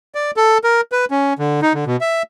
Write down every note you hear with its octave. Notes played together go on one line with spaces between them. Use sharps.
D5
A4
A#4
B4
C#4
D3
D#4
D3
B2
E5